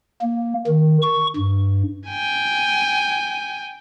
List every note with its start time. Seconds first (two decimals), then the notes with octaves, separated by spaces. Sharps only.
0.22 A#3
0.67 D#3
1.02 C#6
1.36 G2
2.08 G5 G#5